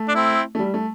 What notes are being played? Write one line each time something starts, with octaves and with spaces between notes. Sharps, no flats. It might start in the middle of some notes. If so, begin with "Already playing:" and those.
Already playing: A3
D4
C4 E4
A3
G3
A3